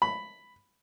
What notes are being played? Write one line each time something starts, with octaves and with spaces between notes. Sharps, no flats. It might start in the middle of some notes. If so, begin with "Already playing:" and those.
B5